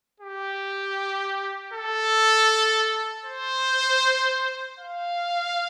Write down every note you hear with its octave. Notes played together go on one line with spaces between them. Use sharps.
G4
A4
C5
F5